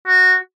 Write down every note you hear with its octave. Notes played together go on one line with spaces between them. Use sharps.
F#4